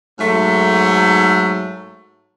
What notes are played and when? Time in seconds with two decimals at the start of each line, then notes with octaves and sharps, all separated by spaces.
0.19 G#2 F#3 A3